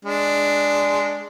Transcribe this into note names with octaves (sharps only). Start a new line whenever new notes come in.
G#3 D4